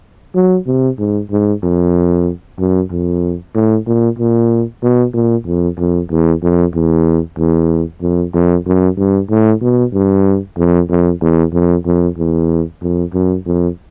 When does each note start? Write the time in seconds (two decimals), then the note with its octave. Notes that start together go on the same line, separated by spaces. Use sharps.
0.35 F#3
0.67 C3
0.98 G#2
1.31 G#2
1.63 F2
2.59 F#2
2.91 F2
3.55 A2
3.86 A#2
4.18 A#2
4.83 B2
5.14 A#2
5.46 F2
5.78 F2
6.10 E2
6.42 F2
6.74 E2
7.38 E2
8.01 F2
8.34 F2
8.66 F#2
8.97 G2
9.30 A2
9.62 B2
9.93 G2
10.58 F2
10.89 F2
11.21 E2
11.53 F2
11.85 F2
12.17 E2
12.81 F2
13.13 F#2
13.46 F2